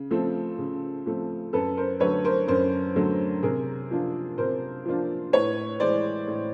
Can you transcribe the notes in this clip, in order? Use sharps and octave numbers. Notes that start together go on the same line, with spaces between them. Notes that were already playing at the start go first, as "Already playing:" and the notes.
Already playing: C#3
F3 A3 C4
C#3
F3 A3 C4
F#2 A4 B4
A#4 C5
D3 F#3 A3 B4 C#5
A#4 C5
F#2 A#4 C5
D3 F#3 A3
C3 G#4 A#4
F3 A#3 D4 F4
C3 A#4 C5
F3 A#3 D4 F4
A2 B4 C#5
E3 G#3 C5 D5
A2